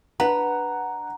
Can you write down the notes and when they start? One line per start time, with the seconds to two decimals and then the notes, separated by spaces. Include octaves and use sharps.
0.20 D4 B4 F#5 A#5